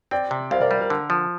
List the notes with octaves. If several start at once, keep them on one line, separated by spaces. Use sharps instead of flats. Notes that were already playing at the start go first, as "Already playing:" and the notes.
C4 D5 G5
C3
C2 C5 F5
A#4 D5
G3
A#4
D3
F3